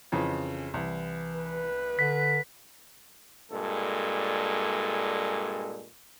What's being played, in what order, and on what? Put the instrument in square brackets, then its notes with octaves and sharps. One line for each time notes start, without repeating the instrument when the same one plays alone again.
[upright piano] F2 C#3 E3
[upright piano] C2 [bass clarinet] E3
[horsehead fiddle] B4
[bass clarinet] D3 [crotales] B6
[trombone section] G2 A#2 G#3 A4